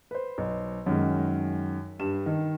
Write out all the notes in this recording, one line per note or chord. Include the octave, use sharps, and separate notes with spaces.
B4 C5
B1
F#2 D#3 G#3
G2 E7
D#3